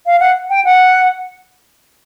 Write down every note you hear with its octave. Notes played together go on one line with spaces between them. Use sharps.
F5
F#5
G5
F#5